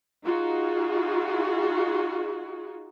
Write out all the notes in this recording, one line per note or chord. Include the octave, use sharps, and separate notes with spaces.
D#4 F4 F#4 G#4